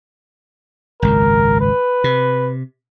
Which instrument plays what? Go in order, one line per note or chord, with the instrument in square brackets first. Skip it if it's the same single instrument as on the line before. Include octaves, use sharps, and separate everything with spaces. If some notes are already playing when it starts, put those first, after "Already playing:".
[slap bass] G#1 C#2 F#2 [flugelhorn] A#4
[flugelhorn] B4
[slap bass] C3